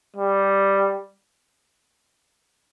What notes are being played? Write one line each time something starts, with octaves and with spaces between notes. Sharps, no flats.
G3